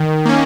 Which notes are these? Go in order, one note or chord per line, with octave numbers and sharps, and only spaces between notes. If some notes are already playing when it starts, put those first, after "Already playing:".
Already playing: D#3
A#3 C#4